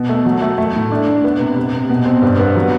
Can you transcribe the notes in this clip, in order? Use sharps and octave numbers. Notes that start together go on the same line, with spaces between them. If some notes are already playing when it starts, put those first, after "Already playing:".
Already playing: B2
A3
F#3
A3
A3
A2
D4
D4
B3
C3
C3
C3
B2
C4
G2
B3
F#3